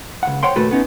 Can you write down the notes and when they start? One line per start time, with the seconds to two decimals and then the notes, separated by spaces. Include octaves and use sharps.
0.23 C#2 F#5
0.43 C5 C#5 F#5 G5 C6
0.56 D#2 A#2 A3 F#4 A4 B4
0.71 B3 C#4 D#4